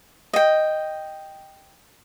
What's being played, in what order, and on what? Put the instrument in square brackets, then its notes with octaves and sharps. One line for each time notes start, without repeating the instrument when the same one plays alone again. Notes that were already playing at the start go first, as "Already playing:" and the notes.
[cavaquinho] D#5 G5